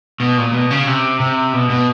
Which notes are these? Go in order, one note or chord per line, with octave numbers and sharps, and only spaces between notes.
B2
A#2
B2
C#3
C3
C3
B2
B2